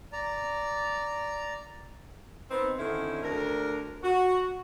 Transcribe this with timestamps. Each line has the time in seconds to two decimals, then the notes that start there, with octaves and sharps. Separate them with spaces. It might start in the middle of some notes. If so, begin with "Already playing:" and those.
0.13 D5 A#5
2.50 B3 C4 D#4
2.78 D3 D#3 C4 C#4 E4
3.22 D2 D4 A#4
4.03 F#4